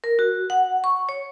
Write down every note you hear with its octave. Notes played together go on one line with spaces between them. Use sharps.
A#4
F#4
F#5
C#6
C#5